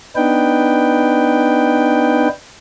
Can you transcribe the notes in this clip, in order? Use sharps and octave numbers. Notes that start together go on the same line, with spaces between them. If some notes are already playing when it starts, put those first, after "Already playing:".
B3 D4 D#4 B4 G5